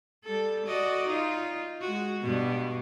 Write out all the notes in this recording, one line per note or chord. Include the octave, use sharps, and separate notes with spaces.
G3 A4
F#4 D5 D#5
D#4 F4
G#3 F#4
G2 B2